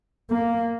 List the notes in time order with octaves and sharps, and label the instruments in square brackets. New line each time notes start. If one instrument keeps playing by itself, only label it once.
[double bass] A#3